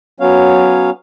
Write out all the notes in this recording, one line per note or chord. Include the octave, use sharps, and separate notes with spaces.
F#3 B3 C#4 C#5 F5